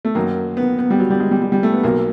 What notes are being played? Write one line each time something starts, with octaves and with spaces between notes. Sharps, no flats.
A3
F#2 D#3 A#3
B3
B3
G3
F#3
G3
G#3
G3
G3
G3
A3
B3
B1 B2 A#3